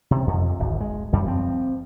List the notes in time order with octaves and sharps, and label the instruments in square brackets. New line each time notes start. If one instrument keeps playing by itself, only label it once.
[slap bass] C3
F2
D1 G#1
G#3
F#2 G3
F3 C4